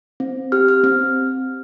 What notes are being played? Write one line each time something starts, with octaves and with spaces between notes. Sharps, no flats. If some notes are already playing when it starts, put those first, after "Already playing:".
C4
G4 F6
F6
C4 F6